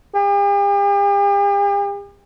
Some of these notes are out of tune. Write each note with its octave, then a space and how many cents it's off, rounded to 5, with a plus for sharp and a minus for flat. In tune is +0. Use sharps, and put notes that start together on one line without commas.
G4 +45